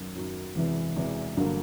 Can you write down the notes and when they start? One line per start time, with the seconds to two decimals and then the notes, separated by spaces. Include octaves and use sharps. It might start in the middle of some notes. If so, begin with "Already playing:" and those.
Already playing: F#2 D#3 F#3
0.15 F#2 D#3 F#3
0.55 E1 E2 C3 E3
0.96 E1 E2 C3 E3
1.36 G1 G2 D3 F#3 A#3